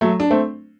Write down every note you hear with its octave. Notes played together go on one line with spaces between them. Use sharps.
F#3 A3
D4
A3 C4